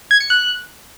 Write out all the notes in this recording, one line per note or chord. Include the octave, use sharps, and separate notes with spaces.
G#6
C#7
F#6